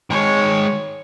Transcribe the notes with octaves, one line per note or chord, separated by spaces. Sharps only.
D#3 G#3 C#5